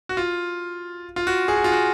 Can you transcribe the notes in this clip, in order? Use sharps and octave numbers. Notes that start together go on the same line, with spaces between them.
F#4
F4
F4
F#4
G#4
F#4
F4
F#4